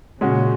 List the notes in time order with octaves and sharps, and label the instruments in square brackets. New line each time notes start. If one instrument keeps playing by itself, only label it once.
[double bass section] A#2 C#3 [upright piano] G#3 C#4 F#4